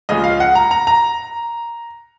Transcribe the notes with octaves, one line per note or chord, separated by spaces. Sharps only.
C#2 C#3 F3 G#3 D#5
F5
F#5
A#5
A#5
A#5